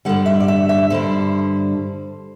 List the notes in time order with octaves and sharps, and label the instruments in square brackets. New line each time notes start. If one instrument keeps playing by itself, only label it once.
[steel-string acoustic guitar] G2 D3 G3 F#5
E5
D5
E5
E5
G2 D3 G3 C5